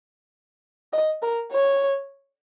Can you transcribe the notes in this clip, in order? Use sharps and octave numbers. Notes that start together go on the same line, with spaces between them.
D#5
A#4
C#5